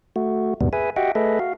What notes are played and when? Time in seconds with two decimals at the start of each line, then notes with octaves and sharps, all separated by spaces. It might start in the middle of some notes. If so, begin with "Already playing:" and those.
0.16 A3 F#4
0.61 D#2 G#2 B2 G3 B3
0.73 G#4 B4 E5 G#5
0.96 F#4 G4 D#5 E5 F#5 G5
1.15 A3 G#4 A4 B4 D#5 E5
1.39 F#4 F5